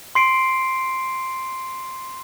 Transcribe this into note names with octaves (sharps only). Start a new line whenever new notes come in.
C6 C7 D7